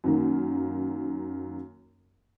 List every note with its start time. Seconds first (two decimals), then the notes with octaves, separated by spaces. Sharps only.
0.04 F#2 D#3 A#3